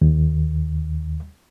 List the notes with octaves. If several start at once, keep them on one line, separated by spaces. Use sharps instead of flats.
D#2